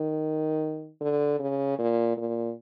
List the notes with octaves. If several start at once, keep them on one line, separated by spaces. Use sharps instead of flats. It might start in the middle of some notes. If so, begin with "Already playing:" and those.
Already playing: D#3
D3
C#3
A#2
A#2